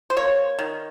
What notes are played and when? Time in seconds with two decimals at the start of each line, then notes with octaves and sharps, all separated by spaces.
0.10 C5
0.17 A#3 C#5
0.59 D#3